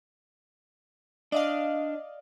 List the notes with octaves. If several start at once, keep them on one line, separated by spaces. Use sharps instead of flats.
D4 D5 D#5 F5